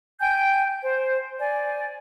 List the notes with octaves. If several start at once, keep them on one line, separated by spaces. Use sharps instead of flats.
G5 G#5 G6
C5
D5 G#5